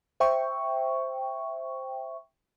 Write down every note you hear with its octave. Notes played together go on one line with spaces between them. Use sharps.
C5 E5 G5 C#6